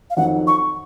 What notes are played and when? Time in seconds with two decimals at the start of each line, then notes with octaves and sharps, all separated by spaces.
0.10 F5
0.16 F2 D#3 F#3 F#5
0.47 C#6